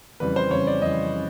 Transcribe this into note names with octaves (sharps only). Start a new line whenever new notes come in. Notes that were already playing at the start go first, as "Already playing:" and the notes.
F2 C#3 E3 G3 B4
C5
F2 C#3 E3 G3 C#5
D5
F2 C#3 E3 G3 D#5
C#3